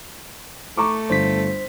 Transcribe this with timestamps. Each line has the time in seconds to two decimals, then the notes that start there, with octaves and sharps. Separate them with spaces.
0.77 A3 A#5 C#6 D6
1.10 G1 C5 B6